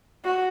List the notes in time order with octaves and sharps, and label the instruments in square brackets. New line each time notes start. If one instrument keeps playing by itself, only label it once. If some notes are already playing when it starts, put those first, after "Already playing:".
[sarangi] F#4